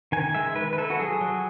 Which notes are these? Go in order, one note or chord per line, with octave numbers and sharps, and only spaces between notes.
D#3 G#5
G#3 E5
D#3 B4
B4
E4 A4
F#4
F#3 G#4
F#3